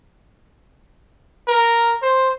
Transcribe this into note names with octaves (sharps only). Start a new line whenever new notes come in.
A#4
C5